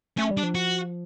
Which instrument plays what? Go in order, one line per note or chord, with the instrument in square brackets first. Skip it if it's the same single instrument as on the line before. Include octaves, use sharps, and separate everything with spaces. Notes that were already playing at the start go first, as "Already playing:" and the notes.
[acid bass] A3 [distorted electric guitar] C#4
[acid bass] G3
[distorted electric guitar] D4
[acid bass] F3
[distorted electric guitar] F#4